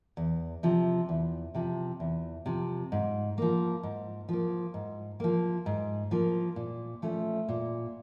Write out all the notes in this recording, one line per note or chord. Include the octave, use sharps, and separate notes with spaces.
E2
C3 F3
E2
C3 F3
E2
C3 F3
G#2
F3 A#3
G#2
F3 A#3
G#2
F3 A#3
G#2
F3 A#3
A#2
F3 A3 C#4
A#2